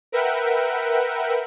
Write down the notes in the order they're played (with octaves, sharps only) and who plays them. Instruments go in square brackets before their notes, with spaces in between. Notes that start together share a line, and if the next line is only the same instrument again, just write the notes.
[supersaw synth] A#4 B4 E5 F#5 G5